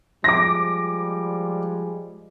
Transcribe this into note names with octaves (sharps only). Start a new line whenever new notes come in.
F3 G3 G#3 D6 A#6